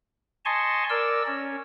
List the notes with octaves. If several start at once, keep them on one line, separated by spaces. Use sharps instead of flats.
D#5 G#5 A5 C6 C#6
A#4 D5 E6
C#4